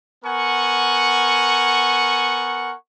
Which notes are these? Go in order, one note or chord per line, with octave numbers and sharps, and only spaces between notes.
B3 A#4 F#5 G#5 C#6